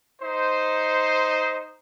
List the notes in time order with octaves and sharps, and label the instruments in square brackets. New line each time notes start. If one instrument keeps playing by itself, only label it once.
[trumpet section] D#4 C5